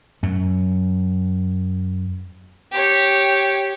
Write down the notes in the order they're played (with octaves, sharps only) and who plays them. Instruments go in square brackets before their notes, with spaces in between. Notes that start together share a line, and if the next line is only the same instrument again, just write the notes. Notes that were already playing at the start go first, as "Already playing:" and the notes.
[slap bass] F#2 F#3
[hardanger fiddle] G4 C#5